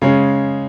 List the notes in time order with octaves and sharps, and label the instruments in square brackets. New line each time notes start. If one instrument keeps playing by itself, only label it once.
[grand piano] C#3 G#3 C#4